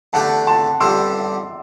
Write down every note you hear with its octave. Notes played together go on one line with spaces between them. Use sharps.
E2 D3 A3 D4 G4 F#5 A5
A5 C6
G2 D3 G3 C4 C6 E6